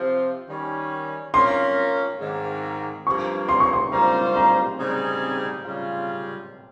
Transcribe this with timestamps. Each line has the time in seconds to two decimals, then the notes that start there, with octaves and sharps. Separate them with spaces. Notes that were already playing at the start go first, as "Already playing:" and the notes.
Already playing: C3 F3 C4 F4
0.47 D#3 G3 C#4
1.33 A#3 C#4 F4 A#4 C6
2.20 G#2 D#3 A#3
3.06 G2 F3 A#3 C#6
3.49 C6
3.60 C#6
3.73 C6
3.92 G2 G3 A#3 F4 C5 A#5
4.36 A#5
4.79 C#3 G3 C4 D#4 G#4
5.65 C#3 G3 C#4 F4